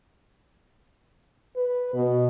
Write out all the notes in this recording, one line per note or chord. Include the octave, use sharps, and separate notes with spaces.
B4
B2